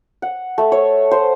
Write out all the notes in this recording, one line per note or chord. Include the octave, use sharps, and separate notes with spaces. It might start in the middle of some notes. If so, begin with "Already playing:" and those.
F#5
A3
C#5
C5